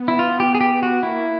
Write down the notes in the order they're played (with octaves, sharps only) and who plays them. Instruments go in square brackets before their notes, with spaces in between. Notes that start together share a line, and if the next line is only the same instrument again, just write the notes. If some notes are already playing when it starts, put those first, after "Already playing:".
Already playing: [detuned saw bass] B3
[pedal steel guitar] E4
F4
G4
G#4
G4
F#4
[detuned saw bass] A#3 [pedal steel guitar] E4